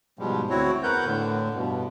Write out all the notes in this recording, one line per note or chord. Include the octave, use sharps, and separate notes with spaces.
G#2 B2 F3 G3 G#3
D2 C4 E4 F#4 C#5
E2 A#4 B4 F#5 G6
A2 D3
G2 B2